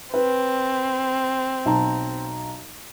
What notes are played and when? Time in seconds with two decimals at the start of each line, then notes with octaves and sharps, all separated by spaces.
0.14 C4 B4
1.65 B1 A5 A#5